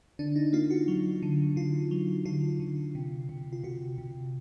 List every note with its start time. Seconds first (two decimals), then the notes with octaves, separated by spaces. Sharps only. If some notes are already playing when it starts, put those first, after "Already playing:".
0.19 D3 D4
0.36 D#4
0.53 A#3 F4
0.71 F#4
0.88 F#3
1.23 D3
1.56 D3 F4
1.91 F#3
2.25 D3 F4
2.60 D3
2.95 C3
3.29 C3
3.53 F4
3.64 C3 F#4
3.98 C3